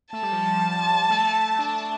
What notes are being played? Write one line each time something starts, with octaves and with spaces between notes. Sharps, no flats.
A3 A5
G3
F3
G3
A3
D4
D4